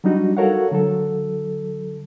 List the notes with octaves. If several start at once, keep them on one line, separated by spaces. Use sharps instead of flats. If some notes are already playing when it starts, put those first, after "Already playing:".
F#3 G3 D4 D#4 F#4
F#4 A4 A#4 C#5 F5 F#5
D3 F#3 A4